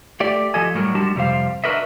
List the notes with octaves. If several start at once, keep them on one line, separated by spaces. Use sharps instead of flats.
A3 G4 D5
F3 G4 A4 D#5 G#5
A2 F#3 G3 A#4
G3 G#3 D4 F#4 G4 A5
F2 C3 G3 G4 C5 F5
D4 F#4 A#4 B4 D#5 E5